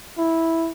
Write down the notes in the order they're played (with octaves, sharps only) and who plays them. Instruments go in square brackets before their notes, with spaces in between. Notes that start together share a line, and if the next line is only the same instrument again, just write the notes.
[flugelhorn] E4